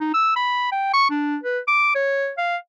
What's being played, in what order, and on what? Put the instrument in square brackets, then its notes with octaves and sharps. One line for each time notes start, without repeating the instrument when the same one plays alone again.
[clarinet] D#4
E6
B5
G5
C#6
D4
B4
D6
C#5
F5